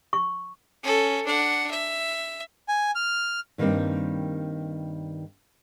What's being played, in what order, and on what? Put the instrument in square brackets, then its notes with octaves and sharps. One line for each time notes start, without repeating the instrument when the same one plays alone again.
[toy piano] C#6
[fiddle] C#4 A4
D4 F#5
E5
[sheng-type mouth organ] G#5
F6
[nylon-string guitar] G2 D#3 G3 A#3 C4